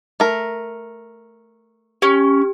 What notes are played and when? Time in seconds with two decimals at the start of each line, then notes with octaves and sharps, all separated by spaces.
0.20 A3 A#4
2.02 C#4 G4